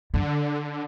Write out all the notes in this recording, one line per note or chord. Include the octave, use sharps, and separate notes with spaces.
F#2 D3